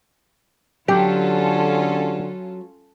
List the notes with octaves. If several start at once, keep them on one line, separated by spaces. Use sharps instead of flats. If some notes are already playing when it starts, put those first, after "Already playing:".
D3 F#3 C#4 F4 G4 A4